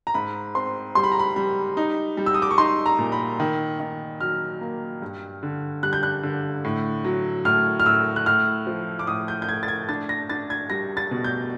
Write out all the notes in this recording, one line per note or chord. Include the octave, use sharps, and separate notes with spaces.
A#5
G#2 B5
C4 C6
G3 C6
B5
A#5
B5
G3 B5
D#4
G3
E6
D#6
D6
C#6
D#4 C6
A#5
A#2
B5
D#3
D#3
F#3 F6
A#3
G2
D3
G3 F#6
G6
F#6
D3
A2
F#3
A2 F6
F6
A2 E6
F#6
A2 F6
F3
D6
A2 D#6
G6
G6
A2 G#6
A6
G#6
D4 A6
A#6
D4 A6
G#6
G3 A#6
A6
B2
G6